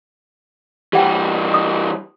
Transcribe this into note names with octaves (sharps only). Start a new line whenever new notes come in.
E3 G3 G4 F#5 G5
D#6